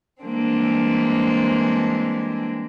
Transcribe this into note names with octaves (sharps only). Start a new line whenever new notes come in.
E3 G3 G#3 A#3 C4 D4